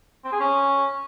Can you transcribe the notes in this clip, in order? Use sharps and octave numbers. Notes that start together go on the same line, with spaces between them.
C4
G#4
C#4